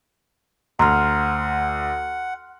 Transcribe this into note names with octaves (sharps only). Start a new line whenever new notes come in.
D2 F#5 A#5 C6 F6